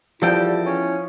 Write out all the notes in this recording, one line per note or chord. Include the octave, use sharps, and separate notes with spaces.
E2 F3 G3 E4 A4 G5
C#4